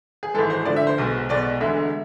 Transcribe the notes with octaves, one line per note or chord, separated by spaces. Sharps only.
G#4
G#1 G#2 E3 G#3 A4
C5
D2 D3 F3 D5
E5
C5
B1 B2 G#3
B1 B2 G#3 D5
E1 D2 D3 G#3 E5